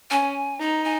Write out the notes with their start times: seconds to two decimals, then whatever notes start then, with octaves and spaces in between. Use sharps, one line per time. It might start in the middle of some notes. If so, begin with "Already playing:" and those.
0.10 C#4 G#5
0.60 D#4 A#5
0.84 G#5